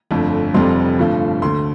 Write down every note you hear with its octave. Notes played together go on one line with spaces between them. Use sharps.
G1 F2 D3 A3
F1 F2 C3 G3 C6
G1 G2 F3 A3
D2 D3 A3 C6